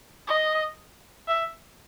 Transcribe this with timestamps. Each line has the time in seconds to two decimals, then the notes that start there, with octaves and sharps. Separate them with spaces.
0.27 D#5
1.28 E5